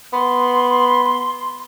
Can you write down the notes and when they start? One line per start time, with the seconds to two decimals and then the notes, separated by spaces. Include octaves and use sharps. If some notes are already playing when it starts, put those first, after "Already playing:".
0.13 B3 C6